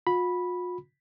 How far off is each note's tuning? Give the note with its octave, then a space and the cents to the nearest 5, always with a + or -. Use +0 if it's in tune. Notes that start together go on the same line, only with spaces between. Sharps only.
F4 +45 B5 -5